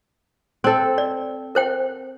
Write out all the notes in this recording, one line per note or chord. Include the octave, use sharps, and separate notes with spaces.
C4 A4 C5
D5
A#4 C5 G5